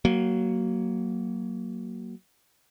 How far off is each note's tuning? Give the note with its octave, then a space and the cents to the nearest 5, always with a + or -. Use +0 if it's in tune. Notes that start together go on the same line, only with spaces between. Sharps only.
F#3 +15 A#3 +0